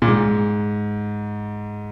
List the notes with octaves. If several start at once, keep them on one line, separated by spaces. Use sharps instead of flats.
A#2
G#2